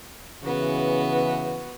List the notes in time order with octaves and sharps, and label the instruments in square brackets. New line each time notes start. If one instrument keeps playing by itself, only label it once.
[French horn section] C#3 E3 [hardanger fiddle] B3 F#4